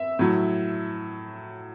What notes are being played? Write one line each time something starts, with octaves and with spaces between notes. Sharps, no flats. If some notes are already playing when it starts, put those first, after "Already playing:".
Already playing: E5
A2 F#3